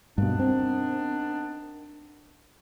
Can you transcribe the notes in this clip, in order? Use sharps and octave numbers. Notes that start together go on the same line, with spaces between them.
G2 B2 D#3 B3 D4
C4